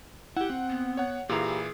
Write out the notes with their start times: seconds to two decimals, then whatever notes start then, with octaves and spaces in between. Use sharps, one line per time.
0.37 E4 G4 F#5
0.50 C4
0.70 B3
0.97 C#5 F#5
1.29 A#2 E3 E4 G4 G#4 F5 A#5